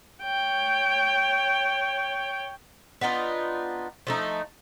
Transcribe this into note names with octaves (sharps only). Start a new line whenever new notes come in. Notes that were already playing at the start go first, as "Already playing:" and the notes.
C#5 G5
B3 D4 D#4 F4
F3 A3 D#4